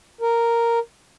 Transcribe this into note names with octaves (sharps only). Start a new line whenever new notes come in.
A#4